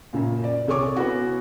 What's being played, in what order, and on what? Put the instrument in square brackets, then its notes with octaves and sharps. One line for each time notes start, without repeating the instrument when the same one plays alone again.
[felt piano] F#2 A#2 C#3
D5
C2 G#4 A4 C#5 C#6 D6
B3 C#4 E4 F#4